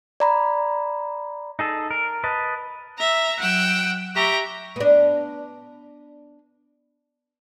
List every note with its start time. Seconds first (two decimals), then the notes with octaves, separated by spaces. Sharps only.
0.20 D5 A#5 B5
1.59 D#4 G#4 A4
1.91 A#4
2.24 B4 D#5 A5
2.98 E5 A#5
3.39 F#3 F#5 G5 E6
4.15 G4 E5 G5 A#5 C#6
4.76 B3 D4